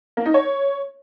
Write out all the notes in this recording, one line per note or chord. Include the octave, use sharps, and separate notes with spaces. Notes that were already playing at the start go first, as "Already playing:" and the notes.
A#3
D#4
C#5